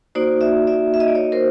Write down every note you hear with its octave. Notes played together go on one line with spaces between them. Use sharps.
A#3 D#4 F#4 C5 D5
D5 E5
D5 E5
E5
D#5
D5
C#5 D#5
A#4 C5